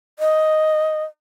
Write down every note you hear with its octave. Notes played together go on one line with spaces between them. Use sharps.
D#5